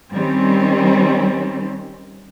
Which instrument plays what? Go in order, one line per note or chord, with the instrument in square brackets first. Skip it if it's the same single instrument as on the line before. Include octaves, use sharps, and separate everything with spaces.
[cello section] D#3 G3 C4 C#4